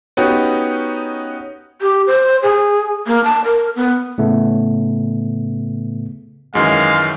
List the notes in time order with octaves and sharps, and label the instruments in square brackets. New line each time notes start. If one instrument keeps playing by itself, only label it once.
[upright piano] B3 C#4 D#4 F#4 G4
[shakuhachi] G4
C5
G#4
A#3
A5
A#4
B3
[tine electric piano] A2 C#3 A3 B3
[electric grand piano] F#2 D#3 E3 [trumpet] G#3 [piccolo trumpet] F5